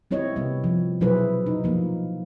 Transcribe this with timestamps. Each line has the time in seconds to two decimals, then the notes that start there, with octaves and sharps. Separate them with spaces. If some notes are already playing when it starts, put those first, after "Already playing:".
0.11 G3 C4 E4 C#5 D#5
0.35 C3 G3 B3 C4
0.64 F3
1.01 B2 F#3 E4 G#4 B4 C5
1.46 D#4
1.64 F3 A#3